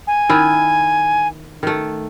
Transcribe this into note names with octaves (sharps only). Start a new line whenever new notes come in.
G#5
D#3 E4
D#3 A3